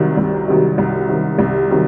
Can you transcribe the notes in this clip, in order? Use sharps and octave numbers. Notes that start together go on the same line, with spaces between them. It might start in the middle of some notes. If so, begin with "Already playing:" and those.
Already playing: C2 C3 D#3 F#3
C2
C3 D#3 F#3
C2
C3 D#3 F#3
C2
C3 D#3 F#3